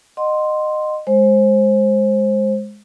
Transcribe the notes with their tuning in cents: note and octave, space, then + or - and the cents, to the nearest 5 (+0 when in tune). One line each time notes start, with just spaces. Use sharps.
D#5 -20 F#5 +0 C6 +0
G#3 +0 C5 +20